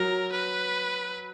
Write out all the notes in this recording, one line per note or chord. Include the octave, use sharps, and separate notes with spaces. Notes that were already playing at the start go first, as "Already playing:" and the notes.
Already playing: F#3 A#4
B4